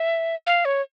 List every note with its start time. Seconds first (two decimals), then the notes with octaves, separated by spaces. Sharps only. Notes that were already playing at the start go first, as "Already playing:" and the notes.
Already playing: E5
0.47 F5
0.65 C#5